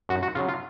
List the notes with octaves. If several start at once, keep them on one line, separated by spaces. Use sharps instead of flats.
F#2 F#4
F#4
C#3 F#3 F4
F4